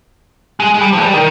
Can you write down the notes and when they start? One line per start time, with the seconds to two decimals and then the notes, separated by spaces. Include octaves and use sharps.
0.60 G#3
0.74 G#3
0.81 G3
0.93 F3
0.98 G#3
1.03 G3
1.14 D#3